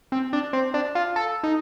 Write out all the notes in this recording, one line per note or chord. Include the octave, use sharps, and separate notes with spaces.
C4
D4
C4
D4
F4
A4
D#4